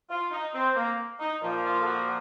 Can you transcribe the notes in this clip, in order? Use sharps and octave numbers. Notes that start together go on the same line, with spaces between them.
F4
D#4
C4
A#3
D#4
A#2 F3 A#3 F4
F4
A4
F#4